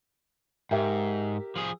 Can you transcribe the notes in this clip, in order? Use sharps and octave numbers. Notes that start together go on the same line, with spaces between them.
G#2 G4 A#4 E5
F3 G#4